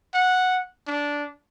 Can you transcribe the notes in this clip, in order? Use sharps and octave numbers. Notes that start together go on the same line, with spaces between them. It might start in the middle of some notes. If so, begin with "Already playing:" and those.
F#5
D4